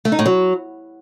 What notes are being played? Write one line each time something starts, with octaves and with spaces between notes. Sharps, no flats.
A3
D#4
A2
F#3